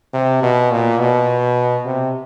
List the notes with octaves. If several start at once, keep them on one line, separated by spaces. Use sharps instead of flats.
C3
B2
A#2
B2
C3